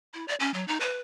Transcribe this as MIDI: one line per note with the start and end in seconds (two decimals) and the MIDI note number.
0.14 0.27 64
0.28 0.35 74
0.40 0.53 61
0.54 0.66 54
0.68 0.78 63
0.80 1.00 71